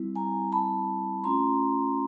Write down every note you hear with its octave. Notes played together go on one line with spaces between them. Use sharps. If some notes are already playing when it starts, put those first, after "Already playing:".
Already playing: G3 C4 E4
G#5 A#5
A5 B5
A3 C#4 F4 A#5 C6